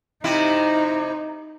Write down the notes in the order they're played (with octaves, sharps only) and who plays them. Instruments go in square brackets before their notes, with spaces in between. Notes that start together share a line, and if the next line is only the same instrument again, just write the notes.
[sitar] C3 C4 E4 [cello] D#4